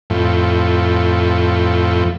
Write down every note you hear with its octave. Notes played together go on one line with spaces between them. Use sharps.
F2 A2